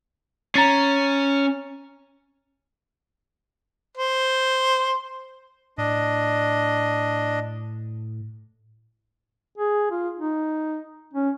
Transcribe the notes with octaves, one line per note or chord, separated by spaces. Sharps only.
C#4 A#5 A6 C7
C5
A2 D4 D#5
G#4
F4
D#4
C#4